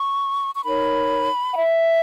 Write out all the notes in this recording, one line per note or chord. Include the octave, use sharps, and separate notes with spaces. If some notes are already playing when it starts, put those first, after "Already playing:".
Already playing: C#6
C#6
D#4 A#4 C#5 B5
F#5
E5